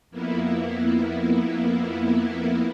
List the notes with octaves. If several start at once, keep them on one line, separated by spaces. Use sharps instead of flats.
F2 A#3 B3 E4